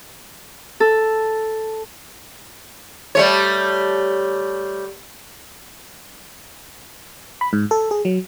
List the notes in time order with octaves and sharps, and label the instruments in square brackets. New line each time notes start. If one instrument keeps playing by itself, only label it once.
[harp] A4
[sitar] G3 A3 C#5
[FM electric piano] B5
G#2
A4
G#4
F#3